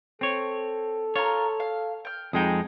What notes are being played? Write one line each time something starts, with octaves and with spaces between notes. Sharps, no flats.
C4 A4 C#5
F4 A#4 C#5
F5
G5 F6
F2 G#3 D#4 G5 D#6